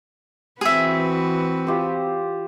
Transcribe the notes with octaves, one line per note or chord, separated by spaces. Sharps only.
E3 C4 F#4 G#4 B4 E5
F4 G4 C5